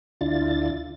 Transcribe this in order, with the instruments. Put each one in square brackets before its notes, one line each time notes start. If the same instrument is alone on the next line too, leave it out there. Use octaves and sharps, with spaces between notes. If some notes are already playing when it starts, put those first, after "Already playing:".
[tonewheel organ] D2 D3 D4 E4 F4 A6